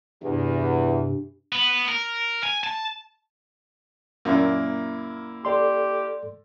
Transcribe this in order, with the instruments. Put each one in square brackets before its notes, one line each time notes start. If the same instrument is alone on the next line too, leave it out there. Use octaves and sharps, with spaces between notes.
[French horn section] E2 E3 [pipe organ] G2 C3
[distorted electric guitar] B3
A#4
G#5
A5
[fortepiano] F#2 A#2 [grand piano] A#3 E4
[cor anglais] G4 [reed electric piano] A4 D5 C6